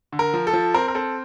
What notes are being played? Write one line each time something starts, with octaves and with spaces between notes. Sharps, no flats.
D3
A#4
F3
A4
F3
C4 A#4
A#4
C4 A4